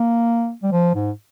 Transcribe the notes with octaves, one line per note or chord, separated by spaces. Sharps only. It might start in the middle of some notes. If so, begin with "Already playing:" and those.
Already playing: A#3
G3
F3
G#2